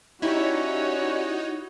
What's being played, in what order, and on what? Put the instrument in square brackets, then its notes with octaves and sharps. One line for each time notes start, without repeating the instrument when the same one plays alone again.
[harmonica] C#4 D5 [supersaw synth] D#4 [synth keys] E4 G4 [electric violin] F#4 C#5